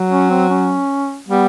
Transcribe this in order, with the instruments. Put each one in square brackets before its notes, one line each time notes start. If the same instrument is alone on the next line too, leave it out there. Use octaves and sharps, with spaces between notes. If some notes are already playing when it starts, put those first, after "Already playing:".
Already playing: [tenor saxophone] F#3
[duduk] C#4
C4
C#4
[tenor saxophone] G3 [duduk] B3